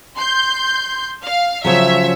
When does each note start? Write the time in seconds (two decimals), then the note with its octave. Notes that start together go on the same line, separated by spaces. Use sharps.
0.16 C6 G6
1.24 F5
1.65 C#3 F3 F#3 C#5 E5